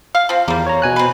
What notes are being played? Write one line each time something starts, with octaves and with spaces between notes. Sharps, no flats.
F5
F3 C4
E2 G3 A#3
C#5 A#5
B2 G#5 F#6
C4 B4